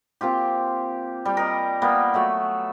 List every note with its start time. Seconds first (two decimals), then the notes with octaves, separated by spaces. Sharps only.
0.21 A#3 C4 F4 G4
1.25 G3
1.37 A#4 D#5
1.82 G3 A#3 B3
2.14 F#3 A3 E5